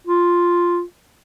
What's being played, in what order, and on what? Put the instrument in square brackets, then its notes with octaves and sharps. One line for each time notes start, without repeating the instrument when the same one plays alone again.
[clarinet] F4